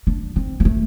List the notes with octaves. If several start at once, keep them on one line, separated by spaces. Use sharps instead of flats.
D4
C4
A#3
A3